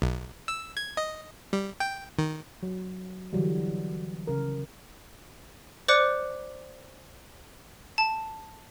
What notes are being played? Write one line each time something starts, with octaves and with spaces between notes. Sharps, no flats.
B1
E6
G#6
D#5
G3
G5
D#3
F#3
D3 E3 F#3 G3
C#3 A#4
C5 D5 D6 F#6 C#7
A5